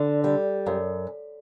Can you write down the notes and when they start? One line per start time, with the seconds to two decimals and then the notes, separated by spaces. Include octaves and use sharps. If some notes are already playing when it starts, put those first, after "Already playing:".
Already playing: D3
0.24 G3
0.66 F#2